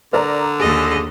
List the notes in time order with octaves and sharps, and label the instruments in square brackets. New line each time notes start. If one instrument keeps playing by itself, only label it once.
[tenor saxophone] D3 [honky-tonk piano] A#4 D5 A#5
[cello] D#2 D#5 [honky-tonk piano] G#4